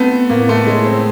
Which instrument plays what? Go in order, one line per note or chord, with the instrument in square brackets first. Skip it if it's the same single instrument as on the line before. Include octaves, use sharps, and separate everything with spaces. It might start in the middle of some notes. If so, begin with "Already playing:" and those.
Already playing: [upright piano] A3 B3 [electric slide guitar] C4
[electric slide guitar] A2 [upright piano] A#3
[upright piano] A3
[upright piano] G#3 [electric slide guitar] C#4
[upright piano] C4